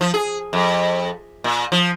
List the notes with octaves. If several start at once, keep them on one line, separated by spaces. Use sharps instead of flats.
F3
G#4
F2
A#2
F3